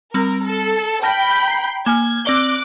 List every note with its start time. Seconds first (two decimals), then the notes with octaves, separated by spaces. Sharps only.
0.14 G3 C4 A#4
0.46 A4
1.03 G5 A5 B5 F6 G6 A#6
1.48 A#5 C7
1.86 A#3 G#5 F6 G#6
2.25 C4 D5 D6 F#6 G7